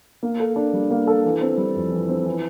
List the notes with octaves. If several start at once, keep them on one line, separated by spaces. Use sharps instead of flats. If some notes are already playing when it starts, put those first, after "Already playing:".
A#3
A4
D4
G3
A#3
A4
E3
C4
G3
F2
E3
C4
E3